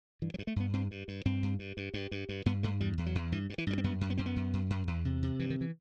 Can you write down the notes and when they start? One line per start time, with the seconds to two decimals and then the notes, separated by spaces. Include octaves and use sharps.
0.22 G2 E3
0.34 F#3
0.39 G2
0.47 A3
0.56 G2 B3
0.73 G2 C4
0.91 G2
1.08 G2
1.25 G2 C4
1.43 G2
1.59 G2
1.77 G2
1.94 G2
2.11 G2
2.29 G2
2.46 G2 B3
2.63 G2 A3
2.80 E2 G3
2.98 E2
3.06 F#3
3.15 E2
3.32 G2 E3
3.50 G2
3.58 E3
3.67 G2 G3
3.78 C4
3.84 F#2 B3
4.01 F#2
4.10 B3
4.18 F#2 C4
4.26 B3
4.36 F#2
4.53 F#2
4.70 F#2
4.87 E2
5.05 C3
5.23 C3
5.39 G2 E3
5.50 D#3
5.61 E3